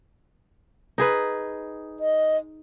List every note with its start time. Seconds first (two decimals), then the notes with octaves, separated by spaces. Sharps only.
0.98 D#4 G#4 B4
1.99 D#5